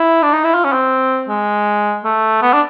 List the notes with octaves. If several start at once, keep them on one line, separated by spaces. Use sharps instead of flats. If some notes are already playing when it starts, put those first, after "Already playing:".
Already playing: E4
D4
D#4
E4
F4
C#4
C4
G#3
A3
B3
D4